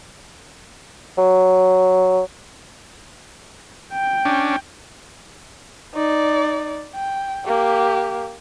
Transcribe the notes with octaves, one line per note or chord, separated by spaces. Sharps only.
F#3
G5
C#4 D4
D#4 D5
G5
A#3 G4